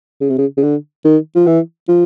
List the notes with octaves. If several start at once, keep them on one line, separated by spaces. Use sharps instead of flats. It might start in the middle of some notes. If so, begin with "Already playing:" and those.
C#3
C3
C#3
C#3
D3
D#3
F3
E3
F3